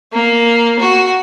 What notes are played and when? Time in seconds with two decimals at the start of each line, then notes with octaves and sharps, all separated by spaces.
0.12 A#3
0.79 F#4